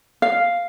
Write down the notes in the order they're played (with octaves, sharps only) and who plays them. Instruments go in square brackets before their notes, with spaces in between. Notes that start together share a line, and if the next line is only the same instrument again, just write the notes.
[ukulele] F5